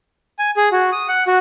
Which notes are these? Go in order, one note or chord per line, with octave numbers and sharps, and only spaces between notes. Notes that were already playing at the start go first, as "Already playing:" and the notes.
G#5
G#4
F#4
D#6
F#5
F#4